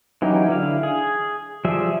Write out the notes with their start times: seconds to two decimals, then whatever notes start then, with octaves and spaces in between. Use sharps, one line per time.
0.22 E3 F#3 C#4 D#4 G4
0.49 D3 E4 F5
0.83 G#4
1.65 F3 G3 G#4 E5